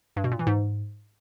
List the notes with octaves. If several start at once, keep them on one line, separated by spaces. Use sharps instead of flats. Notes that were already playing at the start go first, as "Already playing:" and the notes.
G2
B2
A#2
E3
G#2